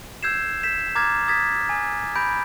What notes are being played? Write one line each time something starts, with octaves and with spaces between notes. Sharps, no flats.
E6 G6 G#6 C7 E7
G6 B6 E7
A#5 D6 F6 G#6 A6
D#6 G#6 A6 B6
G#5 D#6
B5 G6 A#6 D7